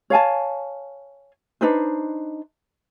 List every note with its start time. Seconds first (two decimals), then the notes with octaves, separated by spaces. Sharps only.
0.10 C#5 F5 G#5 A5
1.61 D4 D#4 B4 C5